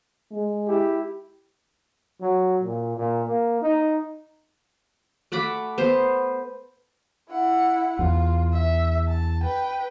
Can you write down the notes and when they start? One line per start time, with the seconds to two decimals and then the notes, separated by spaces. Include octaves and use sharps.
0.31 G#3
0.68 E4 G4
2.21 F#3
2.63 A#2
2.96 A#2
3.27 A#3
3.61 D#4
5.32 A3 F#5 B5 D6
5.78 B3 C5
7.30 E4 F#5
7.99 E2 F4
8.53 E5
9.08 A5
9.43 B4 G5